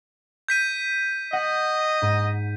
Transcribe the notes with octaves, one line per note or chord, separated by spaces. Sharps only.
G6 B6 D#7
D#5 F#5
G#2